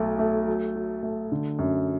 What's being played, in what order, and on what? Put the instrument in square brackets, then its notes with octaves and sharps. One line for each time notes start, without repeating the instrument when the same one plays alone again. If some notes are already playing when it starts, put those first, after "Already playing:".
Already playing: [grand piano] B1 A3
A3
F#3
F#3
A3
D3
F#2